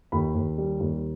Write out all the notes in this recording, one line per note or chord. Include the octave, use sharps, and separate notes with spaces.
D#2 B5
D#2
G3
D#2